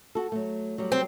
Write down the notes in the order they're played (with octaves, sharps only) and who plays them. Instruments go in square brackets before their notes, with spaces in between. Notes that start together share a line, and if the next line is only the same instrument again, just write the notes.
[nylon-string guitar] F#4 A4
F#3 A3
F#3 G3
[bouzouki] C4